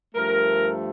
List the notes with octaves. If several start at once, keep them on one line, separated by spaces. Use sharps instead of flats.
G2 F3 A3 A#4